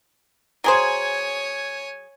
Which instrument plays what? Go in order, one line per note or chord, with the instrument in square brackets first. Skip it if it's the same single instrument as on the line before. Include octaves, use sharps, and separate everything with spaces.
[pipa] F#3 G#4 C5 [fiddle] C#5 G#5